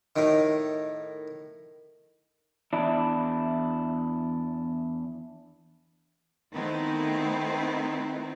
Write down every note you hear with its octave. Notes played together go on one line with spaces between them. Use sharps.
A2 D#3
E2 D4 E4
D#3 A3 B3 C4 D#4 E4